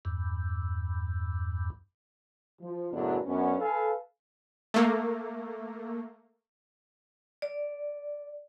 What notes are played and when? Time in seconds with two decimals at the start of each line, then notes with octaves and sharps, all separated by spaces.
0.05 E2 G2
2.61 F3
2.92 F#2 A2 C#3 F#3 B3 D4
3.26 F#2 B3 C#4 D4
3.60 A4 B4 F5 G#5
4.74 A3 A#3
7.42 D5